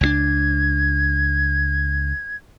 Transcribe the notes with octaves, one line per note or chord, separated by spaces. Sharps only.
C#2 G3 D4 G#6